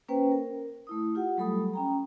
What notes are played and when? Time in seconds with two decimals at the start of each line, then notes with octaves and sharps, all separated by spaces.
0.08 A#3 C#4 B4 C5 G5
0.32 A#4
0.87 A3 E4 D#6
1.15 F4 G4 F#5
1.37 F#3 G3 A3 A4 B5 D#6
1.74 C#4 G5 A#5